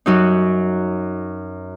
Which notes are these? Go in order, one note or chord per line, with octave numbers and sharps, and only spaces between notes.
F#2 F#3 D#4